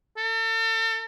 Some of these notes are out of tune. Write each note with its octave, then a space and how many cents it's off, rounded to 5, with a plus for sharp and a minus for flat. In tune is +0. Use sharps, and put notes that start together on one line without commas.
A4 +40